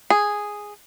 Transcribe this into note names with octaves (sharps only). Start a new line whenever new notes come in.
G#4